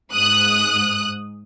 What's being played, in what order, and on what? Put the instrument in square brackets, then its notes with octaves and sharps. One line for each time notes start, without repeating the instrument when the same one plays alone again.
[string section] G#2 D#6 F#6